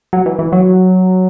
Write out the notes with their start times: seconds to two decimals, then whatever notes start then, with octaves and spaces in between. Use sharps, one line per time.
0.13 F#3
0.26 E3
0.39 E3
0.52 F#3